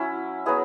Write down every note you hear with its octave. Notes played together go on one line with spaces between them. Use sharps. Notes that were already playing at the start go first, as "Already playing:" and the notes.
Already playing: F#3 C#4 E4
F#3 B3 E4 G#4